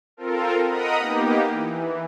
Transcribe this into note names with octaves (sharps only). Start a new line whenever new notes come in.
C4 F4 A4 A#4
A#4 D#5 F#5 A#5 B5 D#6
A#3 B3 D#4 G4
E3